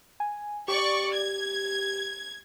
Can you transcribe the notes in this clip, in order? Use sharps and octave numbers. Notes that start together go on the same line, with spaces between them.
G#5
G4 D5 C#6
G#6